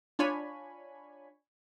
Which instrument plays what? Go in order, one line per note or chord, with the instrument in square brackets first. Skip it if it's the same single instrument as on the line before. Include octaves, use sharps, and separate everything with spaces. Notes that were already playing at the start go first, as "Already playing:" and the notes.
[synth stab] D4 F4 C#5 G#5 B5